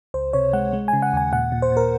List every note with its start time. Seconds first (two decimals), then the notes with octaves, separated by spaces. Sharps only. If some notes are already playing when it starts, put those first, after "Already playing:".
0.14 C#2 C5
0.33 C3 C#5
0.53 G#3 F#5
0.73 G#3
0.88 G#5
0.93 C#3
1.02 F#5
1.13 D#2 G#5
1.33 A#2 F#5
1.52 A#2
1.62 C5
1.72 A#2 A#4